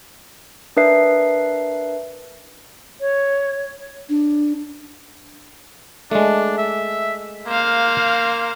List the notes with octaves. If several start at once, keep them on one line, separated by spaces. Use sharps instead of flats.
D4 A#4 B4 E5 C7
C#5
D4
G#3 A3 D4
E5
A#3 C5 F5